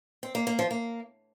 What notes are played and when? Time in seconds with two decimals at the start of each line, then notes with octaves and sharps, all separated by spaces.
0.23 C4
0.35 A#3
0.47 A#3
0.59 F3
0.71 A#3